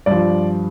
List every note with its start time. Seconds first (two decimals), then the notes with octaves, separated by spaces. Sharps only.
0.06 G2 F3 D5